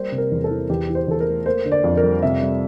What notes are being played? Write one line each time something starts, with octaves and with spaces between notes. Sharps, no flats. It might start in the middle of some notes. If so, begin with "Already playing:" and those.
Already playing: G3 A#3 C5
C3
A#4
E2
A4
E3
E2 G4
E3
C5
E2 A4
A#4
A3
A#3 C5
D3
D5
F2
A#4
G3
C3 E5
G3